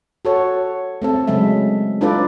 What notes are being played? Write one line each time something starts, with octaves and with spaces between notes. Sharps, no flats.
F#4 A4 C#5
A3 C4 A4
C#3 F#3 G#3 A3 E5
D4 D#4 F4 A4 B4 D5